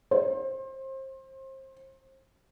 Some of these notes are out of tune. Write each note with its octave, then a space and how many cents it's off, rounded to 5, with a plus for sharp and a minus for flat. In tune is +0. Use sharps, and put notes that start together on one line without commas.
C5 +30